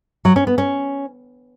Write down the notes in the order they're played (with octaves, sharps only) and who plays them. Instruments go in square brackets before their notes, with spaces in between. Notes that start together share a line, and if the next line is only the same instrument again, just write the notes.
[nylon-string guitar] F#3
C#4
B3
C#4